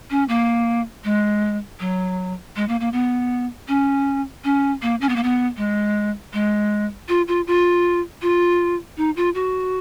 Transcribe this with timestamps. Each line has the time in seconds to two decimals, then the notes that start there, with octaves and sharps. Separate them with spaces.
0.10 C#4
0.29 A#3
1.04 G#3
1.80 F#3
2.56 G#3
2.69 A#3
2.80 A#3
2.93 B3
3.68 C#4
4.44 C#4
4.82 A#3
5.01 C#4
5.09 B3
5.16 A#3
5.23 B3
5.57 G#3
6.33 G#3
7.09 F4
7.28 F4
7.47 F4
8.22 F4
8.97 D#4
9.17 F4
9.35 F#4